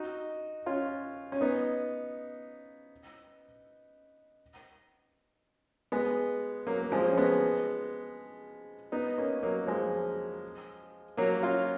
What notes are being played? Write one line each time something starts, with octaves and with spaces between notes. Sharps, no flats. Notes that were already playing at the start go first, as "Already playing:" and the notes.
Already playing: D#4 F#4
C#4 F4
C#4
B3 D#4
G#3 B3
F#3 A#3
A#3
F3 G#3
C#4
G#3 B3
B3 D#4
A#3 C#4
F#3 A#3
F3 G#3
F#3 A#3
C#4 F4